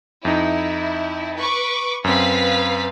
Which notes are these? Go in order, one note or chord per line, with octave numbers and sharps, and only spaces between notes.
F2 D#4 E4
B4 C#6 D6
F#2 C4 B4 F5 B6